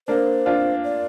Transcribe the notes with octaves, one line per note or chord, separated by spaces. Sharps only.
A#3 D4 C5
D4 F4
D5